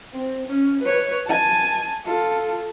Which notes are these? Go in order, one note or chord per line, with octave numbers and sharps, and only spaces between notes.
C4
C#4
B4 C#5
G#5 A5
F4 A4